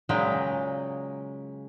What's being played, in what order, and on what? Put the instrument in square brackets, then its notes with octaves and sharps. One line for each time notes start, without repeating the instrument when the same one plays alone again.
[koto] A#2 C#3 F#3 G#3 G5